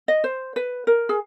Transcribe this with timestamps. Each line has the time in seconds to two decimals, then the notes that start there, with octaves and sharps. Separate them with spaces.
0.08 D#5
0.24 C5
0.56 B4
0.87 A#4
1.09 G#4